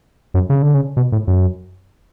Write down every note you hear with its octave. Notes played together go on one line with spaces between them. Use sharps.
F#2
C#3
D3
C#3
B2
A2
F#2